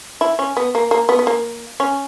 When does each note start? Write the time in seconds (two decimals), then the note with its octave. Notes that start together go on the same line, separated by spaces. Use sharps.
0.21 E4
0.39 C#4
0.57 B3
0.75 A#3
0.91 A#3
1.09 B3
1.19 B3
1.27 A#3
1.80 C#4